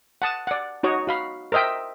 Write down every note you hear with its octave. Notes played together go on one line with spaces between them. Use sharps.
F#5 A5 D#6
D5 F#5
D#4 F#4 C#5 D#5
F#4 F5 B5
A#4 C5 D#5 E5 G5